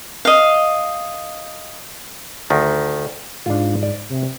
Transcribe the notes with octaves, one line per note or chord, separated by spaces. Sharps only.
D#5 F5
D2 D#3
G#2 D4 F4
D5
C3